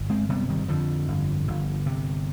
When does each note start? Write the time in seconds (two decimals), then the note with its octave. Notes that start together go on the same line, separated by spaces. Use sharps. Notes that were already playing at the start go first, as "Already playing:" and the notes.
Already playing: G1
0.10 G#3 C4
0.29 C3 G3 B3
0.49 D#3 G3
0.68 F2 D3 F3
1.08 G1
1.47 G1
1.86 C3